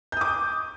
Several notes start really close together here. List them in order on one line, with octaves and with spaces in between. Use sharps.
G6 D#6 D6